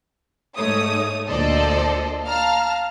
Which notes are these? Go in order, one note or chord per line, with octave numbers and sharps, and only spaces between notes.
G#2 A3 C#5 D#6
D2 A#2 A4 C5 D5 D#5
F5 A5 A#5 F6